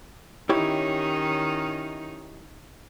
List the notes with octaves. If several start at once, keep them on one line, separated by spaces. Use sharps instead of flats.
D#3 C#4 D#4 E4 G4 C#5